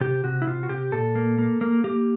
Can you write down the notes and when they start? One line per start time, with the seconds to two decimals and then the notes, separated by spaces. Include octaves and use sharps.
0.01 C3 G4
0.24 C3 F#4
0.42 E4
0.47 C3 F4
0.63 F#4
0.69 C3 G4
0.92 A#2 A4
1.15 A#3
1.39 A#3
1.61 A#3
1.84 A#3 G4